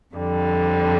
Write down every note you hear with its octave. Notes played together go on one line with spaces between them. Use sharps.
F2 D3 G3